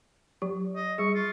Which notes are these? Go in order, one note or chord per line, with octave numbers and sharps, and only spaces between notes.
F#3 G4
D#5
G3 G#4 C#6
F4